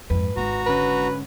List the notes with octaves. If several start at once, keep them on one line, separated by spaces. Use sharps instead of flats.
F2 G#2 B4
G#1 F#4 A#5
G#2 D3 C#4 B4